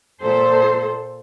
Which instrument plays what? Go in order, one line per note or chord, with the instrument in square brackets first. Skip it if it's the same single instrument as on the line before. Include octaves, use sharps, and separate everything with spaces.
[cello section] A#2 A4 C5